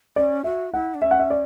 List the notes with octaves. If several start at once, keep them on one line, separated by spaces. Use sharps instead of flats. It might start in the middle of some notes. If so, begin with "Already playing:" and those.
C#4 D5
F#4 E5
E4 F#5
D4
C#4 E5
F#5
E5
D5